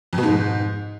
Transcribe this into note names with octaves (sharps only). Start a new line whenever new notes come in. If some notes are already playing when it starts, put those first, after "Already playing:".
F2
B2
G#2